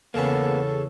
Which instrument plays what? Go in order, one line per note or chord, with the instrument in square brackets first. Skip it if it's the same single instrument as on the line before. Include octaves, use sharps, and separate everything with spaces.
[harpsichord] E2 C#3 C#4 [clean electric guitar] A#3 B3 [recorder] A4